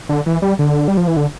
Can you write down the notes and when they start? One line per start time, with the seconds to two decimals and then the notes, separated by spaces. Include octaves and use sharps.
0.09 D3
0.26 E3
0.42 G3
0.59 D3
0.88 G3
0.97 F3
1.07 E3
1.17 D3